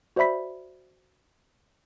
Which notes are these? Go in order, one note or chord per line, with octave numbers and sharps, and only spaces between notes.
F#4 C5 D5 E5 B5 B6